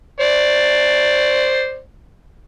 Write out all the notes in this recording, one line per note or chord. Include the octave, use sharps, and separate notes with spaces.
C5 D5